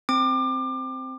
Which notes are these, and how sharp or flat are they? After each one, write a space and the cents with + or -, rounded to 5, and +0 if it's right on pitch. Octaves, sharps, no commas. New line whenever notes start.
C4 +0 D6 +30